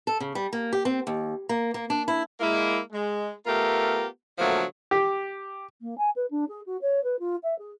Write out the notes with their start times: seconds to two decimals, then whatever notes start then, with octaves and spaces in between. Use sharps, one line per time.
0.07 A4
0.20 C#3
0.35 G3
0.53 A#3
0.73 G4
0.85 C4
1.07 D#2
1.49 A#3
1.74 A#3
1.90 D4
2.08 E4
2.40 G#3 A#3 E4
2.92 G#3
3.46 A3 B3 F4 G4 A#4
4.38 B2 D3 F3 F#3 A3 A#3
4.91 G4
5.82 A#3
5.98 G#5
6.16 B4
6.31 D4
6.49 G#4
6.66 F#4
6.82 C#5
7.04 B4
7.20 F4
7.43 E5
7.59 G#4